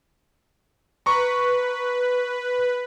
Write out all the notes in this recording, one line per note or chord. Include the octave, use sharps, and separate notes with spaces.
B4 A#5 C#6